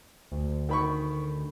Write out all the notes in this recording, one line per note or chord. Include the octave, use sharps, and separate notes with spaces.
D2
D#3 B5 C#6